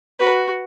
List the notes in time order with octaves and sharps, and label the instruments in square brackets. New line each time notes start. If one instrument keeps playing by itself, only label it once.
[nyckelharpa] F#4 [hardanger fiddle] B4